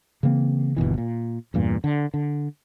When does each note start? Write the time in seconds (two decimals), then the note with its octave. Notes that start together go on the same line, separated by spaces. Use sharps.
0.23 C#3 E3 A#3 C4
0.77 G1 D#2 B2 E3
0.98 A#2
1.54 E2 G2 A#2
1.84 D3
2.14 D3